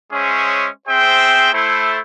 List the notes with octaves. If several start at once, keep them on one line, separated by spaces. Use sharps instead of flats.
G#3 C#4 G#4 C5 C#5 E5
C4 G#4 C5 E5 G5
A3 E4 C5